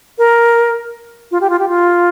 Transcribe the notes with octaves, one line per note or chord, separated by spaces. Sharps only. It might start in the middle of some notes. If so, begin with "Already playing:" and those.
A#4
F4
G4
F4
G4
F4